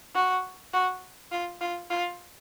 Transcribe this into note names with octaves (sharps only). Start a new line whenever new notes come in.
F#4
F#4
F4
F4
F4